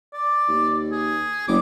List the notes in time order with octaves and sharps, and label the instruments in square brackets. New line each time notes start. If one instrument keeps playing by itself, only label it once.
[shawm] D5
[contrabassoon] D#2
[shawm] G#4
[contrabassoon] F#1 [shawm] D6